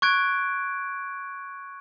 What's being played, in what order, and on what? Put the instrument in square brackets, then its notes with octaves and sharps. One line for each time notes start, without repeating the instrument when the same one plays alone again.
[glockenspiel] C#6 F#6 G#6 D7